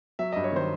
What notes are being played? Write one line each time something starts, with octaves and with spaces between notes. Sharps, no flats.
F#3 E5
G2 D#5
C#5
D#3 C5